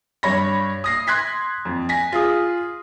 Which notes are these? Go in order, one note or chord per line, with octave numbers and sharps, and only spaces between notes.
G2 C#5 B5 A#6
D#6 A#6 C7
C6 F#6 G#6 B6 C7
F2
G#5 A#6 B6
F4 G#4 D#6